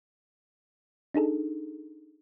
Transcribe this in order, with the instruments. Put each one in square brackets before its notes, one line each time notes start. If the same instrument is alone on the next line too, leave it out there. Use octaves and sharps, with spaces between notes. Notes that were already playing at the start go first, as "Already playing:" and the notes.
[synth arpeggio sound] D4 D#4 G#4 A4